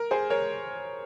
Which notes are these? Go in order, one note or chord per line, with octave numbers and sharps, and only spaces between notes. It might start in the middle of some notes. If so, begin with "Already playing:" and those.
Already playing: A#4
G#4 C5
A#4 C#5